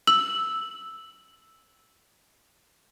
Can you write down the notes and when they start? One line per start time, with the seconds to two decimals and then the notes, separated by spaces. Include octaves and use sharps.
0.07 E6 F#7